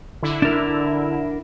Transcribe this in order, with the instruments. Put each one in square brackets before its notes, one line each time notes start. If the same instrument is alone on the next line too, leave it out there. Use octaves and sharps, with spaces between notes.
[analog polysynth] D3 E4
[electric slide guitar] D4 A#4